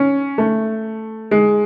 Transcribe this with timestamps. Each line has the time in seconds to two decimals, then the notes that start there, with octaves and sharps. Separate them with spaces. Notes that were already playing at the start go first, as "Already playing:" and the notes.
Already playing: C#4
0.38 A3
1.31 G#3